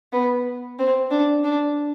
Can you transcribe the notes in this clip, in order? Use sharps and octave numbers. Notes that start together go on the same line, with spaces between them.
B3
C4
D4
D4